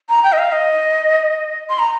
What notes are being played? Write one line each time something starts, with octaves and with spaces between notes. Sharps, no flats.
A#5
G5
D#5
F5
D#5
C6
A#5